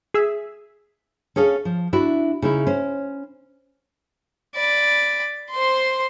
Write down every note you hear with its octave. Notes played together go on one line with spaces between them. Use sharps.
G#4 E5
C#4 G#4 A4 F5
F3
D4 E4 F#4
C#3 D#4 E4
C#4 C5
D5 B5
C5 C6